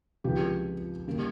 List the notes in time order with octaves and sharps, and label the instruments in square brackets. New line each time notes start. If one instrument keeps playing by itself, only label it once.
[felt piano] C#2 C3 F3 G#3 G4
C#3 G3 A#3